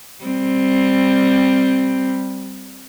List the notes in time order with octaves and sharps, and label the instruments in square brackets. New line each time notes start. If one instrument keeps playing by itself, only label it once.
[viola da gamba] G3 C4